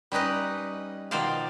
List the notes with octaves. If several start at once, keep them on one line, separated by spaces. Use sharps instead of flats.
G3 C#4 D#4 B4 D#5
B2 D#3 F3 C5 D5 F5